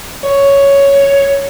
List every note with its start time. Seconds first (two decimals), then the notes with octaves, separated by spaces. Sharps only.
0.23 C#5